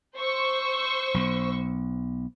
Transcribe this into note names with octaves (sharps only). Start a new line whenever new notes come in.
C5 C#6 E6
B1